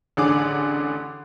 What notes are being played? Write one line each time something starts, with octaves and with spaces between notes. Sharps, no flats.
A1 D3 G#4 D6